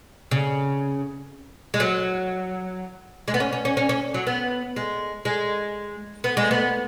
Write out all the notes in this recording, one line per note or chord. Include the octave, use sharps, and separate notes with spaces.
C#3
G#3
F#3
G#3
B3
C#4
C#4
C#4
C#4
C#4
F#3
B3
G#3
G#3
B3
G#3
B3